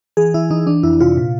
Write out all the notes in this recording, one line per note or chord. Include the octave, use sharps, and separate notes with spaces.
E3 G#4
E3 E4
E3 D#4
E3 D4
F2 E4
C3 F4
A#2